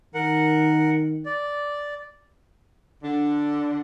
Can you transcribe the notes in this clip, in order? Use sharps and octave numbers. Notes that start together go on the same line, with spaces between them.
D#3 A#4 F#5
D5
D3 D4